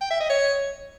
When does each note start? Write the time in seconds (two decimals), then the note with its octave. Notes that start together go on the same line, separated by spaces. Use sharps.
0.01 G5
0.10 E5
0.20 D#5
0.29 C#5